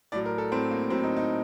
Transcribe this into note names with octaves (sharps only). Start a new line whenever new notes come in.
A2 F#3 D5
A#4
A4
A2 F#3 C4
A#3
A2 F#3 C4
D#4
D#4